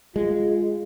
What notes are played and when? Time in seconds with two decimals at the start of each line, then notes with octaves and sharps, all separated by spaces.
0.16 G#3 F4